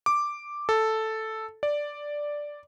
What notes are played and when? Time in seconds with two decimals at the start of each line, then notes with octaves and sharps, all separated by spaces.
0.06 D6
0.69 A4
1.63 D5